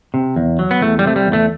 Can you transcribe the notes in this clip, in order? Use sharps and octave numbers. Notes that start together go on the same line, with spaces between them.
C3
E2
F#3
B3
E2 A3
G3
C3 A3
G3
E2
A3